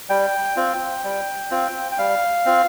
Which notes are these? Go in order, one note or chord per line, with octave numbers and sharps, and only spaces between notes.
G3 G5
C4 F4
G3
C4 F4
G5
G3 F5
C4 F4